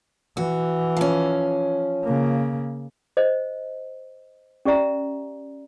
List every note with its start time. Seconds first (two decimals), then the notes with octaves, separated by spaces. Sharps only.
0.37 E3 F#4
0.97 F3 C#4
2.04 C#3 A#3
3.17 C5 D#5
4.65 C#4 G4 D5 E5 A#5